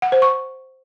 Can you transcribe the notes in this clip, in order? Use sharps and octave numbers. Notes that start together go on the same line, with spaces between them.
F#5
C5
C#6